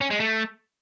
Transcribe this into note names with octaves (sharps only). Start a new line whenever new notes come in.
C#4
G#3
A3